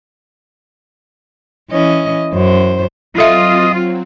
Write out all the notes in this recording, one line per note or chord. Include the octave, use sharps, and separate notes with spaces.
E3 C#4 D#5
F#2 C5
F#3 C4 F4 A4 D#5 E5